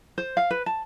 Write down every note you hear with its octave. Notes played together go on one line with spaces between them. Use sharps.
C5
F5
B4
A5